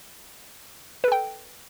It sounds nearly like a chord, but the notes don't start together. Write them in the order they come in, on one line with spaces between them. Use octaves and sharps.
B4 A4 G5